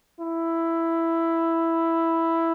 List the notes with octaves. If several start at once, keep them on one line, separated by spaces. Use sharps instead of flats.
E4